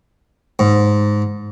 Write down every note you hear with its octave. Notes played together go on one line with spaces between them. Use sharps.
G#2